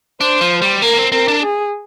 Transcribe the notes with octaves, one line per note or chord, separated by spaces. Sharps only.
D4 C5
F3
G3
A#3 A#4
C4
C4 A#4
D4
G#4